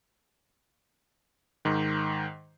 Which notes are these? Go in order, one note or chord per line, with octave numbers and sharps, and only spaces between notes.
G#2 D#3